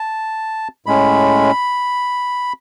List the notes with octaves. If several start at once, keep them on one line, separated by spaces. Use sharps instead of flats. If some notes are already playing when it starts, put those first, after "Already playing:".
Already playing: A5
A2 G#3 C#4 B5